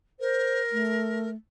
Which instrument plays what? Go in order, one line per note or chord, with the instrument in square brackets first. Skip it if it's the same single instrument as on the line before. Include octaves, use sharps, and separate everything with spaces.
[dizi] A#4 [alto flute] C5
[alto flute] A3